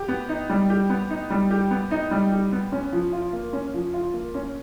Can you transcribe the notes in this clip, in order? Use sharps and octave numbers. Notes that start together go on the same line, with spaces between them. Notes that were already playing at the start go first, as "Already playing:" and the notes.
Already playing: G4
B3
D#4
G3
G4
B3
D#4
G3
G4
B3
D#4
G3
G4
B3
C#4
F3
F4
A#3
C#4
F3
F4
A#3
C#4